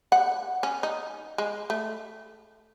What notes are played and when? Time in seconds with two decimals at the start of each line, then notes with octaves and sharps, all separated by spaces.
0.12 F#5
0.63 C#4
0.83 D#4
1.38 G#3
1.70 A3